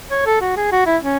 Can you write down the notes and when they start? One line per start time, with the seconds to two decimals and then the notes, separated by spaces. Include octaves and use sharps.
0.11 C#5
0.26 A4
0.41 F#4
0.57 G#4
0.72 F#4
0.86 E4
1.03 C#4